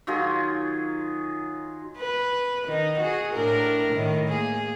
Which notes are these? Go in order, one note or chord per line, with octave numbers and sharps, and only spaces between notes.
D#3 F#3 F4 G#4
B4
D#3 D#4
F#4 G#4
A2 D4 A#4
A2 D#3
A#3 G#4